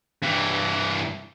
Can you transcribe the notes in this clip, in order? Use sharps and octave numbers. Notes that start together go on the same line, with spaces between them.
G2 E3